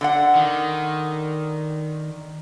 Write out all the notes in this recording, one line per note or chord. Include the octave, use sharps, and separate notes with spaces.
D3 D5 F#5
D#3